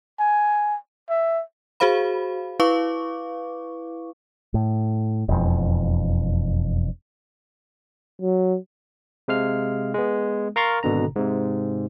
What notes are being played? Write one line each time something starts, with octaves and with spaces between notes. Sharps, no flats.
G#5
E5
F#4 G#4 C5 F5 B5
E4 B4 F5 C#6 D6
A2
E1 F2
F#3
C3 G#3 F5 F6
G#3 B3
A#4 F5 A#5 C6 C#6 A6
G#1 B2 D3 A#5
G#2 C3